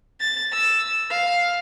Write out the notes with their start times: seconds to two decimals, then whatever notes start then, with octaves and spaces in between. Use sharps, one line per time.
0.20 A6
0.52 E6
1.10 F5